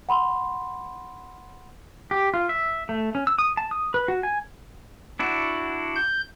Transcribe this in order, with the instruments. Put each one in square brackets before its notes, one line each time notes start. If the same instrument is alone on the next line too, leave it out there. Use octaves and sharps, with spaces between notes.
[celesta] F#5 B5 C6
[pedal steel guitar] G4
F4
E5
A3
C#4
E6
D#6
A5
D#6
B4
F#4
G#5
D4 E4 F#4
[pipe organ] G6